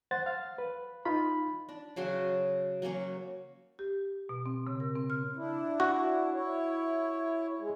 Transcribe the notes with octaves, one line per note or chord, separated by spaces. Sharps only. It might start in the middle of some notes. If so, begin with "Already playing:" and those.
C5 F#5 A6
F5
B4
D#4 F4 B5
D4
C#3 F#3 F#4 C6
F#3 A#3 C#4 C#5
G4
B2
C4
C#3
A#4
C4
F6
D4 E4
F#4
E4 C#5
G#3